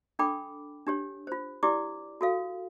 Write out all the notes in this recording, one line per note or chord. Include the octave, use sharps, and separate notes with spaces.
D4 A4 G5 B5 D6
D4 G4 C#5
F4 C5
E4 G4 D5 D6
F#4 A4 F5